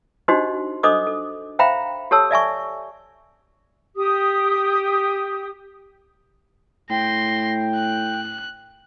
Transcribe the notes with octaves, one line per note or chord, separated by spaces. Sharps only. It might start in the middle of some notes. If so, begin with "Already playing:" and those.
D4 D#4 F#4 G4 C5 D#5
D4 A4 C5 D#5 D6 D#6
A4
C5 E5 F5 G5 A#5 B5
G4 A4 C#5 A5 E6
D5 E5 G#5 C#6
G4 D#6
A2 G5 C6 A#6
F#6